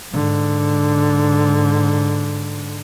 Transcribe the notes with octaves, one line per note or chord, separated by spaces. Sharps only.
G#2 D3